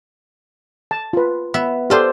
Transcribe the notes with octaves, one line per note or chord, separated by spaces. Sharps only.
A5
F4 B4
B3 E5
F4 G4 A4 C5 D5 C6